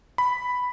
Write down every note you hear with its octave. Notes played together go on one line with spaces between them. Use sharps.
B5